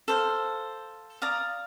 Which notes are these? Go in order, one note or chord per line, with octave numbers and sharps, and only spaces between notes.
A4 C5 F5
D5 F5 A#5 D#6